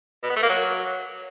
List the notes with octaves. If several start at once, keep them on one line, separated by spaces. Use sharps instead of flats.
B2
B3
A3
A#3
F#3